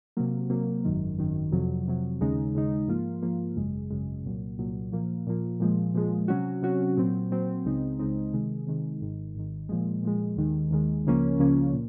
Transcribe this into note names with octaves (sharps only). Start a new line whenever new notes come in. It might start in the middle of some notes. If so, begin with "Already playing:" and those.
C3 F#3 A#3
C3 F#3 A#3
G#1 F#2 D#3
G#1 F#2 D#3
F2 C3 F#3
F2 C3 F#3
D#2 C#3 G#3 D#4
D#2 C#3 G#3 D#4
G#2 F3 A#3 F4
G#2 F3 A#3 F4
G#1 F#2 C#3 G#3
G#1 F#2 C#3 G#3
C2 A#2 F#3
C2 A#2 F#3
A#2 F3 A#3
A#2 F3 A#3
A#2 F3 G#3
A#2 F3 G#3
C3 F#3 C#4 F#4
C3 F#3 C#4 F#4
A#2 F#3 C4
A#2 F#3 C4
C#2 C#3 G#3 C4 D#4
C#2 C#3 G#3 C4 D#4
C3 D#3 G#3
C3 D#3 G#3
G#1 G#2 D#3
G#1 G#2 D#3
A#2 F3 G#3
A#2 F3 G#3
D#2 D#3 G#3
D#2 D#3 G#3
C#2 C#3 F3 A#3 C#4
C#2 C#3 F3 A#3 C#4
A#2